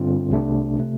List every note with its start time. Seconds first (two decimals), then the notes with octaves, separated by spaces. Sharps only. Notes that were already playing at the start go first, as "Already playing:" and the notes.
Already playing: G2 D3 G3 C4 F4
0.30 C2 C3 A3 D4
0.79 C3 A3